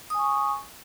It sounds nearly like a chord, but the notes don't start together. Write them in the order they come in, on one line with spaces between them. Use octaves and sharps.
D#6 G#5 C#6